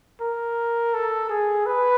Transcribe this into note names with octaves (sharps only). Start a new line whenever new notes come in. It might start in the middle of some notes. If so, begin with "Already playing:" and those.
A#4
A4
G#4
B4